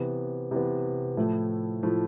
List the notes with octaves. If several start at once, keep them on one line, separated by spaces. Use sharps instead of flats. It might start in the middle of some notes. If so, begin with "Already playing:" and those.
Already playing: C3 E3 B3
C3 E3 B3
A2 F3 A3 E4
A2 F3 A3 E4